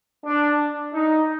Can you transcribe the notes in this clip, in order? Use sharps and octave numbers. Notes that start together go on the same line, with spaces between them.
D4
D#4